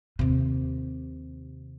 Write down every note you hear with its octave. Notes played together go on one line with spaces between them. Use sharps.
D#2 C3